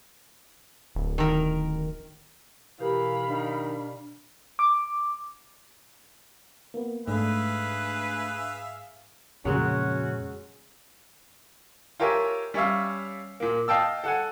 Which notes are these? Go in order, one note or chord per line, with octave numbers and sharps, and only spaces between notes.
D1
D#3 A#4
B2 E3 G4 A#4 F5 B5
D#3 D4
D6
A#3 B3
G#2 A3 D4 G#4 B4 E5 F5
F2 A#2 C#3 F#3 G#3 C#4 F#4
F4 G4 A#4 C#5 E5 G#5
G3 C#4 C#5 E5 F5
A#2 A#3
D#5 F5 G5 A5 E6
A4 F#5 G#5